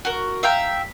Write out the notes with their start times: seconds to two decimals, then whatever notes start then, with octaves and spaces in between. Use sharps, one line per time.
0.05 F#4 A#4
0.43 E5 F5 G5 A#5